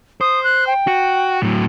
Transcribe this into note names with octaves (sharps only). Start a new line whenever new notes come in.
C5 D#6
F#6
G5
F#4
A2 F#3